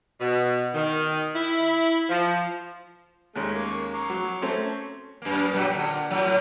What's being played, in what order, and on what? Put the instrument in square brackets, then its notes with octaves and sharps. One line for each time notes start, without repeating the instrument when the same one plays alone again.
[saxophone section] B2
D#3
E4
F3
[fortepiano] D#2 G#3 C#4 [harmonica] A3
[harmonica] A#3 C#5
A#5 C#6 D6
[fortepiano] F#3
A3 C4 C#4
[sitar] F#2 A#3
A#2 F#3 G3
A#2 D3
A2 F#3